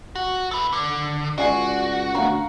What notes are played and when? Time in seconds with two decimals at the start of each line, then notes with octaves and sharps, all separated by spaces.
0.15 F#4
0.51 A4 B4
0.73 D3
1.38 C#2 F#4 D5 G#5 C7
2.15 D2 F5 F#5 A#5